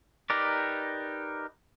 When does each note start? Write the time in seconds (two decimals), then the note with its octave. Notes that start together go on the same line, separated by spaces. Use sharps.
0.30 D#4 G4 A#4 B4 D5